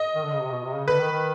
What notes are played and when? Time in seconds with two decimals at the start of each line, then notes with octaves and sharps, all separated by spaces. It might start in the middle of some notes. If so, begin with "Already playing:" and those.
Already playing: D#5
0.15 D#3
0.24 D3
0.33 C#3
0.42 C3
0.51 B2
0.64 C3
0.75 C#3
0.88 D3 B4
1.00 D#3
1.12 D#3